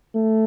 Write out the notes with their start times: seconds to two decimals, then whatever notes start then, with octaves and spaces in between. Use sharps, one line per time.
0.15 A3